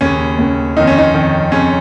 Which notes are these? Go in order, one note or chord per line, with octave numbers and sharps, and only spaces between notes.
D#2 C#3 C#4
D#2 C#3
F2 D#3 D#4
C#4
D#4
F2 D#3
F2 C#3 C#4